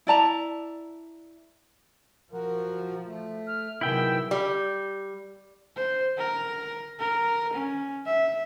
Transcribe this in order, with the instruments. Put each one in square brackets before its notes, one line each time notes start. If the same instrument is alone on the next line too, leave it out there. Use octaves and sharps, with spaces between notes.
[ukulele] E4 D5 A5 A#5
[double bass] F3 [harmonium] F#4 A#4
[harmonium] A3
[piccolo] F6
[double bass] C3 F#3 [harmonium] D#3 B3 G#4 [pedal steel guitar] E4 G5 [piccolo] E6
[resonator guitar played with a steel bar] G3
[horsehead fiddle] C5
A#4
A#4
C#4
E5